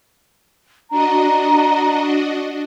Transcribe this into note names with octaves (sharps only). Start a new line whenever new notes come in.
D4 F#4 D#5 A#5